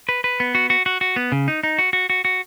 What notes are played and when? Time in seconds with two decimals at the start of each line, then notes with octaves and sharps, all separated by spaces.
0.09 B4
0.24 B4
0.40 B3
0.55 F#4
0.70 F#4
0.86 F#4
1.01 F#4
1.16 B3
1.32 C#3
1.48 D#4
1.63 D#4
1.78 F#4
1.93 F#4
2.10 F#4
2.25 F#4